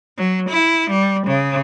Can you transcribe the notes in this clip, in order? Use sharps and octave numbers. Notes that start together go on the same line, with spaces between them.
F#3
E4
G3
C#3